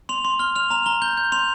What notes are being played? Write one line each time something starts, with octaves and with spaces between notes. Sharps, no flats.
C6 F7
C6
F6 G7
F6 F7
A#5 F7
A#5 G7
G6 G7
G6
C6 F7